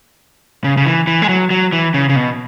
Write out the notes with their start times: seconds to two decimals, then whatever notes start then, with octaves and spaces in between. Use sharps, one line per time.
0.64 C#3
0.77 C#3
0.85 E3
1.07 E3
1.22 G#3
1.29 F#3
1.50 F#3
1.72 E3
1.94 C#3
2.09 C#3
2.16 B2